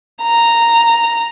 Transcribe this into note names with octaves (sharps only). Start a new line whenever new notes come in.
A#5